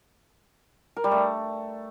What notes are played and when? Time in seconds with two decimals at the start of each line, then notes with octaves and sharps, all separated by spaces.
0.96 A#4
1.04 G3
1.11 A3